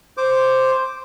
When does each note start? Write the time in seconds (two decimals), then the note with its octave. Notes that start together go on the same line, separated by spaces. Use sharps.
0.17 C5 D6